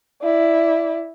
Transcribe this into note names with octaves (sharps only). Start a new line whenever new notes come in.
E4 D5